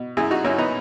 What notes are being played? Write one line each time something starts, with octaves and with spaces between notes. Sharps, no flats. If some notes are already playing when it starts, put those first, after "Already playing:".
Already playing: B2
F#2 E4 G#4
D#4 F#4
F#2 C#4 E4
B3 D#4